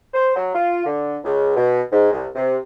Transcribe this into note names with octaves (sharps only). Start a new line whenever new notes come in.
C5
F#3
F4
D3
C#2
B2
G#2
C2
C3